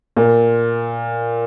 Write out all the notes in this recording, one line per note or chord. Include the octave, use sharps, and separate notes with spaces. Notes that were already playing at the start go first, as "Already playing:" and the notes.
A#2